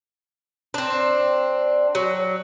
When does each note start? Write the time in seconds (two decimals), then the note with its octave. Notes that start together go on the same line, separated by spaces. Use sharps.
0.74 C4 D4
1.95 F#3